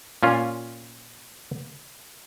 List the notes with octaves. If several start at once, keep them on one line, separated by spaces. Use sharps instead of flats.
A#2 C#4 F4